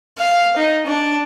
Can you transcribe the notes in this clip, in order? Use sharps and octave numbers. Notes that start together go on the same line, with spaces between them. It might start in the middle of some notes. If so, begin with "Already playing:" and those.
F5
D#4
D4